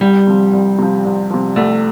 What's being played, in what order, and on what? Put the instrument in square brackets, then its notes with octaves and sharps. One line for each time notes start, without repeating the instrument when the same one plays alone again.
[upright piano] C2 [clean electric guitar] G3
[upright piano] C3 F3
C2
C3 F3
C2
C3 F3
[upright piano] C2 [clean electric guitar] A3